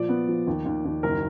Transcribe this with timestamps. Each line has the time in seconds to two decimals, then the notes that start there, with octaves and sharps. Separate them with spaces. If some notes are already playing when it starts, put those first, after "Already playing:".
Already playing: A#2 F3 D5
0.09 B3
0.28 F3
0.47 D#2
0.65 D#2
0.85 D#2
1.03 F#1 A#4